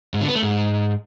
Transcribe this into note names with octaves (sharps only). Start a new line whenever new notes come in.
G#2
D3
B3
A3
G#2